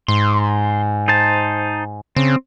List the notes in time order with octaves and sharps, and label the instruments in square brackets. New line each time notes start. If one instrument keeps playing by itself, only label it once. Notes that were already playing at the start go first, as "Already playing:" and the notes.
[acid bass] G#2 [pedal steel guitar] C6
[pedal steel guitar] D#4 C5 A5
[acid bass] C#3 [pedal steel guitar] C4